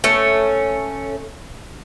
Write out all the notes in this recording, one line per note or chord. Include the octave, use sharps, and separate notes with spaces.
A3 C#4